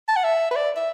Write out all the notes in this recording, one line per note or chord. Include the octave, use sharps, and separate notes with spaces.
A5
F#5
E5
B4
D5
E5